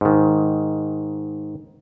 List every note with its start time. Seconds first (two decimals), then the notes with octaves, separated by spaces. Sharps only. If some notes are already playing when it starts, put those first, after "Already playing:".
0.01 G#2 D#3